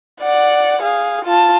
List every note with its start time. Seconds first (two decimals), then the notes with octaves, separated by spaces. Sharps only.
0.22 D5 F#5
0.83 G#4 F5
1.25 F4 A5